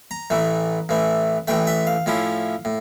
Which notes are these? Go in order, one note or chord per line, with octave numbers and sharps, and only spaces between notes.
A#5
A1 A2 E3 A3
A1 A2 E3 A3
A1 A2 E3 A3 G5
E5
F5
A2 F3 C#4 E4
A2